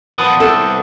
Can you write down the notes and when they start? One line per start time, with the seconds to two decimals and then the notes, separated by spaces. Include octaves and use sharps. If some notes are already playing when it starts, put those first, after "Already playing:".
0.18 A#2 F3 B3 A5 D#6
0.40 C2 G4 A4 E5